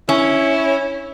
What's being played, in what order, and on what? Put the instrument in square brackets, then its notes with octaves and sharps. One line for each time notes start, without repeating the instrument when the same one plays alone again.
[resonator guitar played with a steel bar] C#4 [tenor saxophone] E4